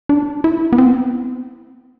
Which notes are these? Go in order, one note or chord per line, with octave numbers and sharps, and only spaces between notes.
D4
E4
B3
C4
B3